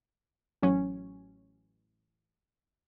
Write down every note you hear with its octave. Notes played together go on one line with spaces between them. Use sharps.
A1 F#3 C#4